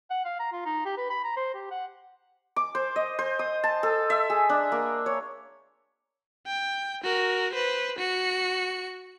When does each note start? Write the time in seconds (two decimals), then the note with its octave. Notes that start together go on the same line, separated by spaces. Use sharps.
0.10 F#5
0.25 F5
0.39 A#5
0.52 F4
0.66 D#4
0.85 G4
0.97 B4
1.10 B5
1.24 A#5
1.36 C5
1.54 G4
1.71 F#5
2.56 D6
2.75 C5
2.96 D#5
3.19 C5
3.39 D#6
3.64 A5
3.83 A4
4.10 E5
4.30 G#4
4.49 D4
4.72 A#3
5.06 C#5
6.47 G5
7.04 F#4 A#4
7.53 B4 C5
7.99 F#4 C#7